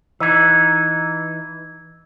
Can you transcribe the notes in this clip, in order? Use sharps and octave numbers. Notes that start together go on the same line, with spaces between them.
E3 D#4 E6 G#6